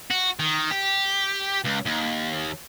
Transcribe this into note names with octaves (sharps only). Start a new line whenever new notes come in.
F#4
D#3
G4
C#2
D#2